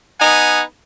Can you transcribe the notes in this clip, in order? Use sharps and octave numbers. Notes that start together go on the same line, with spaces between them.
B3 D#4 F#5 G#5